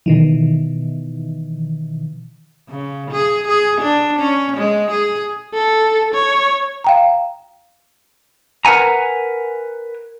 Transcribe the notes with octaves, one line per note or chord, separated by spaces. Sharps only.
B2 D#3 E3
C#3
G#4
G#4
D4
C#4
G#3
G#4
A4
C#5
F5 G5 A#5
A#4 B4 C#5 F#5 G#5 A#5